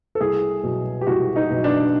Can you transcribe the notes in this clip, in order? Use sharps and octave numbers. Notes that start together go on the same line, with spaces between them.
A4
C2 G#4
B2 F#3
G4
C2 F#4
D#4
B2 F#3
D4